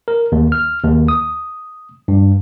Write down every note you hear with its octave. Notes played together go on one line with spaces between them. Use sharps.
A#4
D#2
F6
D#2
D#6
G2